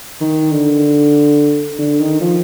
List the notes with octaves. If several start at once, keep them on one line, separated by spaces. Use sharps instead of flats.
D#3
D3
D3
D#3
F3